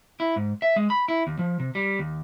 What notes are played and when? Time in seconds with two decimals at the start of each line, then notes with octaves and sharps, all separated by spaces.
0.20 E4
0.36 G#2
0.62 E5
0.76 G#3
0.90 B5
1.08 E4
1.27 D#2
1.39 F3
1.60 C3
1.75 G3
1.99 D#2